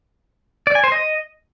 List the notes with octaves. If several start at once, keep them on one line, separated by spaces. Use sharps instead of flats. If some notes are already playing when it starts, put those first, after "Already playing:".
D5
G#5
C5
D#5